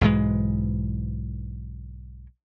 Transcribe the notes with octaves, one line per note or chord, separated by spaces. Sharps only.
B1 G#2 E3 G#3